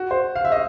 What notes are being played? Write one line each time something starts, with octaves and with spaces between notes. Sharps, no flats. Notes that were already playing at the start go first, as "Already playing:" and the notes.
Already playing: F#4
C5
F5
E5
D#5